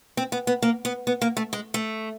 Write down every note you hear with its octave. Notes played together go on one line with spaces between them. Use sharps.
C4
B3
B3
A#3
B3
B3
A#3
A3
G#3
A3